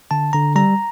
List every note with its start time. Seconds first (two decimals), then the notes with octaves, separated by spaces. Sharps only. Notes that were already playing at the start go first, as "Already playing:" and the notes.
0.11 D3 A5
0.33 D3 A#5
0.56 G3 A#5